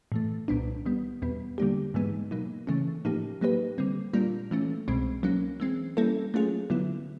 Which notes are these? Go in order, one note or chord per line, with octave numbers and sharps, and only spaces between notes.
A2 E3 A3
C2 A#2 G3 B3 D4
D#3 G3 B3
E2 B2 G3 B3
D3 G3 A#3 D4 G4
G#2 E3 G#3 B3 D#4
B2 F#3 A#3 D#4
C#3 E3 A3 C#4
A2 F3 A#3 D#4 G4
F#3 A#3 D#4 G4 B4
D3 G3 C4
A#2 G3 A#3 D4 F4
E3 A3 C#4
C2 B2 G#3 C4
F#3 A#3 C#4
E3 G#3 C4
G3 A#3 C#4 E4 A4
F#3 A3 C#4 F4 G#4
D3 F#3 B3 E4